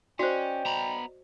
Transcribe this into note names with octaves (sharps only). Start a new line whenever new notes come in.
C#4 F#4 C5 D5 D#5 G5
B3 A#5 B5